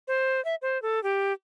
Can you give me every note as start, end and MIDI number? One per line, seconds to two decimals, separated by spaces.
0.08 0.43 72
0.45 0.55 76
0.62 0.80 72
0.82 1.02 69
1.03 1.33 67